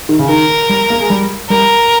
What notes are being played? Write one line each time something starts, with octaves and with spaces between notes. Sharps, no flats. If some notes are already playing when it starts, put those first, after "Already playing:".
D#3
C#3
D#3 A#4
G3
A#3
G#3
G3
G3 A#4